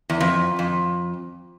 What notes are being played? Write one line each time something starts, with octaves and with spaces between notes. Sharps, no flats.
E2
F2
F2